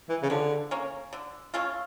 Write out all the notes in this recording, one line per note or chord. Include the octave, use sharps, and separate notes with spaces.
E3
C#3
D3 F3
A#3 C#4
D3
A3 C#4 F4